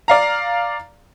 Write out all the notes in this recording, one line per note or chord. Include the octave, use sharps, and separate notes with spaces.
D5 F5 A#5